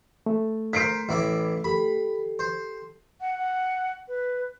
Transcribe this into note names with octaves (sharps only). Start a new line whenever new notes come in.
A3
A#4 C5 B6 C7 D7
A1 E4 D6
G4 A4 B5
C5
F#5
F#5
B4